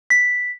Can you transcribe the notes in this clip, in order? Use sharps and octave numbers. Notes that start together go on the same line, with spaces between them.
B6